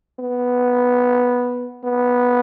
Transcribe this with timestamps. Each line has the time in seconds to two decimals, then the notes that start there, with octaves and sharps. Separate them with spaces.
0.19 B3
1.84 B3